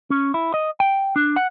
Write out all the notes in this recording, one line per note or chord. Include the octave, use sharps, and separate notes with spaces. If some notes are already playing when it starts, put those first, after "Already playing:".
C#4
E4
D#5
G5
D4
F#5